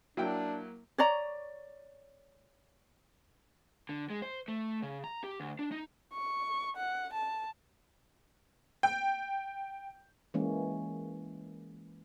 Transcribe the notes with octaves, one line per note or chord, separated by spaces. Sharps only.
F#3 A#3 D4 E4 G5
C#5 D5 A#5
D3
G#3
C5
A3
C#3
A#5
G4
D2
D4
D#4
C#6
F#5
A5
G5
E3 G#3 A#3 C#4